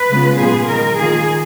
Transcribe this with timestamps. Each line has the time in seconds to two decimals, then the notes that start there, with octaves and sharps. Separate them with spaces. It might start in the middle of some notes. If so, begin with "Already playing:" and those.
Already playing: B4
0.10 C#3 G#3 B3 F4
0.39 A#2 F#3 B3 F4 G#4
0.69 D#3 G#3 D#4 A#4
0.98 D#3 A#3 F4 G#4